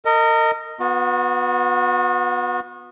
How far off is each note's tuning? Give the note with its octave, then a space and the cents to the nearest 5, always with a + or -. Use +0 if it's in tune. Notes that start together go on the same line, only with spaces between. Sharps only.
A#4 -35 D#5 +0
B3 +0 F#4 -40